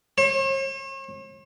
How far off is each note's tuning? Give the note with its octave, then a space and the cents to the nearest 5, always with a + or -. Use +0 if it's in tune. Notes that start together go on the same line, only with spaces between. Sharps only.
C#5 -45